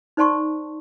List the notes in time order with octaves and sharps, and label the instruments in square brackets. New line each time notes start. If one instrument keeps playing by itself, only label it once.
[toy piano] D#4 C5 D5 A5 C6 C#6